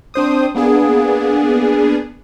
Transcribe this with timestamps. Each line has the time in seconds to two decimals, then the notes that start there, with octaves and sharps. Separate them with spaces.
0.14 C4 D4 C5 D#6
0.55 A#3 B3 D4 G#4